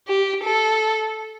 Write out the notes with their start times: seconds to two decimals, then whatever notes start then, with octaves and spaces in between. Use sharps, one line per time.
0.08 G4
0.44 A4